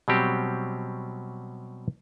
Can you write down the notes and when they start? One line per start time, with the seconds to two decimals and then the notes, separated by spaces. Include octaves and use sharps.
0.08 B2 F#3 G3 C4 G4